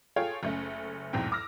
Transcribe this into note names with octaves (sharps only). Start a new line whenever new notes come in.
F4 G#4 A4 C#5 F5 G5
F#1 A3 C#4
B1 E2 G#2 C4 G5
D6 E6 F6 A#6